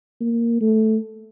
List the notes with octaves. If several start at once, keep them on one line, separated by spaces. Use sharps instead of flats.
A#3
A3